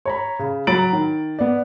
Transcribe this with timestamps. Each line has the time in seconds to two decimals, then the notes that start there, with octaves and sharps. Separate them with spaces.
0.06 C#5 A#5 B5
0.39 C#3
0.67 F#3 A#5 B5 A6 D7 F#7
0.93 D#3
1.39 B3 D5